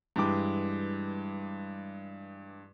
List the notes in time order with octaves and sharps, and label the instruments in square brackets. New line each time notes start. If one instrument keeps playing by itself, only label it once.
[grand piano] G2 E3 G#3 G4 D6